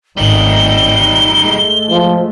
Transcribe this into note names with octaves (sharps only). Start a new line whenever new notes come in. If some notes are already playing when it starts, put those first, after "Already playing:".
G#1 G3 A3 D#4 G7
G#3 A3
F3